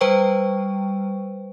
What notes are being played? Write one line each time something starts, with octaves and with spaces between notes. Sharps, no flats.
G3 B4 C5 G5 C#6